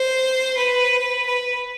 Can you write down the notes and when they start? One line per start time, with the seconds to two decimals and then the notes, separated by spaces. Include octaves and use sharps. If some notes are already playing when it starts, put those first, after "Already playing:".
Already playing: C5
0.57 B4
1.26 B4